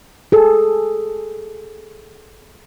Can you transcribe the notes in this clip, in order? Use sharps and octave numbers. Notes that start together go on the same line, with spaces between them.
G#4 A4